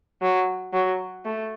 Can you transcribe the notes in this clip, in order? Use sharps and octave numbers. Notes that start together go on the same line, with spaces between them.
F#3
F#3
A3